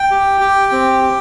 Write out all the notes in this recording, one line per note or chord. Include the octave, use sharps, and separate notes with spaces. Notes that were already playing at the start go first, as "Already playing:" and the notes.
Already playing: G5
G4
G4
C4
G4